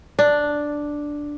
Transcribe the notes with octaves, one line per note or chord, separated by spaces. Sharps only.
D4